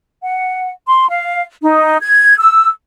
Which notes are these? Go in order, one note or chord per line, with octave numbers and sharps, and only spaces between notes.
F#5
C6
F5
D#4
G#6
E6